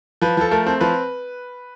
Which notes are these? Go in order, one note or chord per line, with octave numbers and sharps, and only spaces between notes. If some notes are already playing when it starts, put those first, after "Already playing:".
F3 B4
F3 A4
A3 A#4
C4
F3 B4